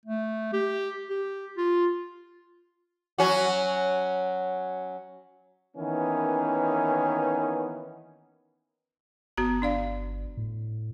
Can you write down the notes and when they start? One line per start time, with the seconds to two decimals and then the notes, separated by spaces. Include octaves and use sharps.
0.06 A3
0.53 G4
1.10 G4
1.57 F4
3.18 F#3 C#4 F#4
5.77 D#3 E3 A#3 B3 C#4
9.37 G1 B3 F#4 A#5
9.62 D4 D5 F5
10.37 A2